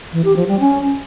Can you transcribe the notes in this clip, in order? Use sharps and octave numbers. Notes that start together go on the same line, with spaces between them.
E3
G4
F3
G3
C#4